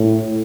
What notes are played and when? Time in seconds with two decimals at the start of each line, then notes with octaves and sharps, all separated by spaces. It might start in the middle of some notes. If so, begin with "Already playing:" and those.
Already playing: A2